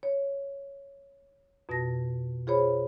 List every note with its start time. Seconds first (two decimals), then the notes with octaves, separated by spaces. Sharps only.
0.03 C#5
1.69 F2 B2 F#4 A5 A#6
2.47 F4 G#4 C5 C#5 B5